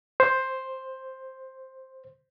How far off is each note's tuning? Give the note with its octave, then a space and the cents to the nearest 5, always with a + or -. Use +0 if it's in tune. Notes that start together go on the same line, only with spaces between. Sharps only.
C5 +5